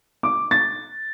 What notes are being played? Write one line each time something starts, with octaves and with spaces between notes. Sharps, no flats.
D6
A6